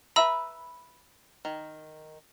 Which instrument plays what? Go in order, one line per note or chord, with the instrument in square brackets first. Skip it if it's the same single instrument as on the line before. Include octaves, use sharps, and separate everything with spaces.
[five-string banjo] B4 E5 A#5 [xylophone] B5 E6
[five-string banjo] D#3